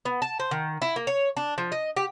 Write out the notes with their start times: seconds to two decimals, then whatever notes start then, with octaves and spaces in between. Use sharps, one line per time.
0.05 B3
0.22 A5
0.40 C5
0.51 D#3
0.82 E4
0.96 A#3
1.07 C#5
1.37 D4
1.58 F3
1.72 D#5
1.96 G4